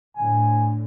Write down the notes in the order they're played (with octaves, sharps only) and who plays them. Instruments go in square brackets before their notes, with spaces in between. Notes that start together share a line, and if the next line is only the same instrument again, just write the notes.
[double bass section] A2 D3 [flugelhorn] G#5